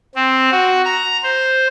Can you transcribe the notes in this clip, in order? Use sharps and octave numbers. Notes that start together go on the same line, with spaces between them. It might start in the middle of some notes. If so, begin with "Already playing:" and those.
C4
F#4
A#5
C5